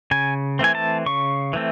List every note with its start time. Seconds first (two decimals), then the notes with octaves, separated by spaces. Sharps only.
0.11 C#3 G#5
0.59 E3 A3 C4 G#5
0.75 A5
1.06 C#3 C#6
1.53 E3 A3 C4